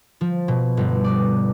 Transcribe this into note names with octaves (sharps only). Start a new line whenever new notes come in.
F3
B2
G1
D5